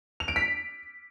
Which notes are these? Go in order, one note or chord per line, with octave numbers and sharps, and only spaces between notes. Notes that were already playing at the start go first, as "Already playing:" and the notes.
F7
D7
B6